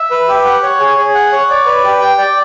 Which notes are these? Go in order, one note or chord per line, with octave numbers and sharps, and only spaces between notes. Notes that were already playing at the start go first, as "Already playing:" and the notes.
Already playing: E5
B4
G4
F#5
C#5
G#4
G#4
F#5
C#5
D5
B4
G4
G5
D5